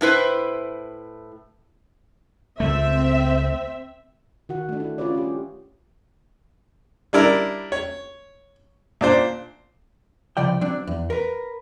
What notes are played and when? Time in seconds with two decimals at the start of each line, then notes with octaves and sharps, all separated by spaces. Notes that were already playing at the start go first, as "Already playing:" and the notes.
0.01 A2 E4 B4 C5
2.60 C#2 A3 C4 E5
4.49 D#3 F#4 F#5
4.69 A3 D4
4.80 E4
4.98 C#4 F4 G#4 B4 C#5 D5
5.15 C#4 G4
7.13 G3 D4 E4 A#4
7.72 C#5
9.01 A#2 D4 C5
10.37 C2 C#3 F3 D5 G5
10.61 F#3 C4 D4
10.87 E2
11.10 A#4 B4